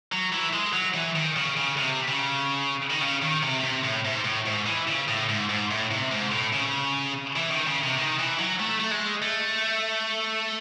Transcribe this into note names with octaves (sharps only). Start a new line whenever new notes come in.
F#3
E3
G#3
F#3
E3
D#3
C#3
C#3
C3
C#3
D#3
C#3
D#3
C3
C3
A2
G#2
A2
G#2
E3
C#3
A2
G#2
G#2
A2
C3
G#2
A2
C#3
E3
D#3
C#3
C3
D#3
E3
F#3
A3
A3
G#3
A3